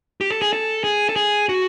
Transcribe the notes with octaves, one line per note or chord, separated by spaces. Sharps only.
G4
A4
G#4
A4
G#4
A4
G#4
F#4